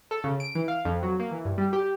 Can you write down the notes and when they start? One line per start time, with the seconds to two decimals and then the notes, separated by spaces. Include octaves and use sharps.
0.11 A4
0.24 C#3
0.40 D7
0.55 E3
0.68 F5
0.85 F2
1.03 F#3
1.19 A#3
1.31 E3
1.45 G2
1.58 G3
1.73 G4